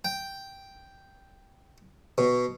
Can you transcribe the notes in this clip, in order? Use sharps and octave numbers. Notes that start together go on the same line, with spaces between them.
G5
B2